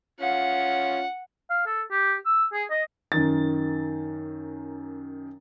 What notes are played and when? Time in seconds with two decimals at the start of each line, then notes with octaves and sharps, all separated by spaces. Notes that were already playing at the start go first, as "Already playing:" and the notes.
0.20 C#4 F4 F#5
1.50 F5
1.66 A4
1.91 G4
2.26 E6
2.53 G#4
2.70 D#5
3.12 F#2 D#3 A6